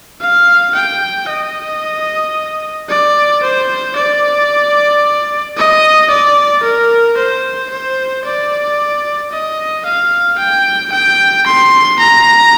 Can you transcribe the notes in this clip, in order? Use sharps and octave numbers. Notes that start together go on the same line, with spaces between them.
F5
G5
D#5
D5
C5
D5
D#5
D5
A#4
C5
C5
D5
D#5
F5
G5
G5
C6
A#5